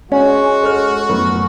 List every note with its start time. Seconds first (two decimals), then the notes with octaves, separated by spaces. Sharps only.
0.12 G#3 C#4 F#4
0.63 A4 C#5 F6
1.09 F#2 A2 B3